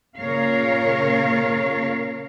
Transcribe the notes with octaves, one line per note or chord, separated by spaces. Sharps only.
A#2 C#3 A#4 C#5 F5